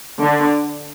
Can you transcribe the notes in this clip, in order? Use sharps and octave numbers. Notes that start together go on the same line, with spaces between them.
D3